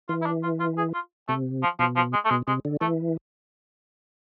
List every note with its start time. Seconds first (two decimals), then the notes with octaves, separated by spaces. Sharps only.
0.09 E3 F4
0.22 E4
0.26 D4
0.43 F4
0.60 F4
0.78 G#4
0.94 F4
1.28 C3 A3
1.63 F3
1.79 B2 F3
1.96 F3
2.13 G#3
2.25 A3
2.30 B2 G#3
2.48 C3 G#3
2.65 D3
2.81 E3 A3